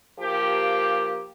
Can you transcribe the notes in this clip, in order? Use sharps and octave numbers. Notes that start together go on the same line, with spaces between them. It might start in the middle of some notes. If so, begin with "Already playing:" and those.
F3 A#3 G4